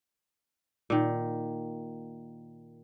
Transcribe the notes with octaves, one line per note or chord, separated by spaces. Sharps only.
A#2 D#3